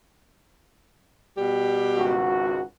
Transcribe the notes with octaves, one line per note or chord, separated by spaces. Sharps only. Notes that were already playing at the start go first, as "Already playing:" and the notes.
B2 G3 G4
G#1 C#2 F#4